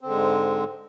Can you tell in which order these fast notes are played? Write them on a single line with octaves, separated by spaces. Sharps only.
C4 D3 G#3 G#2